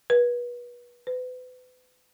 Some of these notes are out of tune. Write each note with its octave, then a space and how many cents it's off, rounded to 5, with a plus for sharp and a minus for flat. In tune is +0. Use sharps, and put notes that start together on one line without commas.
B4 -30
B4 +35